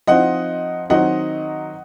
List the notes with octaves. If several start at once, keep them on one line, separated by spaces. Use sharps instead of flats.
F3 C4 D#4 D#5 F#5
D#3 F#3 C4 D#4 D#5 F#5